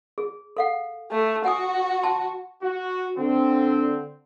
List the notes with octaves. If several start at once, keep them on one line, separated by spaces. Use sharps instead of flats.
G#4
A4 F5 F#5
A3
F#4 F#5 G#5 D#6
A5 C6
F#4
D3 C4